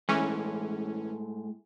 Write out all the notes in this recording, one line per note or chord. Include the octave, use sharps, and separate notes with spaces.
A2 E3 G#3 C#4